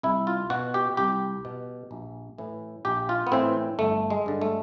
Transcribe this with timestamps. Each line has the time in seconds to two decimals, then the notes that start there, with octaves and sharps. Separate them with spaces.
0.03 C2 E4
0.27 F4
0.50 B2 F#4
0.74 G4
0.97 C2 G4
1.45 B2
1.91 A#1
2.38 A2 E3
2.85 A#1 G4
3.09 F4
3.27 B3
3.32 A2 E3 C4
3.79 G1 A3
4.10 G#3
4.26 G2 D3
4.41 A3